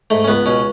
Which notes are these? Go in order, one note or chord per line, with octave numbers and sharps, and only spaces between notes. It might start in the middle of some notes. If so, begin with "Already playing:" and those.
G#2 A3
C#4
C#2 B3
B2 C#4